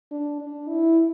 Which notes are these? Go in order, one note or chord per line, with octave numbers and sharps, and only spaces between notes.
D4
D4
E4